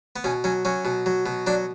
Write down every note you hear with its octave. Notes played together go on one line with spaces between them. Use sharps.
B3
B2 C#4
F#3 C#4
F#3 C#4
B2
F#3
B2
F#3 D4